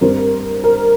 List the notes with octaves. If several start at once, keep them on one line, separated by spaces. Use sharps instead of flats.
G2 G3 C4 A#4
A#4